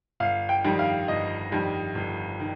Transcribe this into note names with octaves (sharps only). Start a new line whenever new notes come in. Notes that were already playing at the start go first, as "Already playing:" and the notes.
G1 F5
G5
F2 D#3 G3
F5
G1 D#5
F2 D#3 G3
G1
D#3